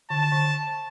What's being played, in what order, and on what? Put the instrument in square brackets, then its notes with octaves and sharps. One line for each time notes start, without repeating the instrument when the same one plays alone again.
[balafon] D3 [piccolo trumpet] A5
[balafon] D3